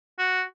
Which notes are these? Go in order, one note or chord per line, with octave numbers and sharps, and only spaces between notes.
F#4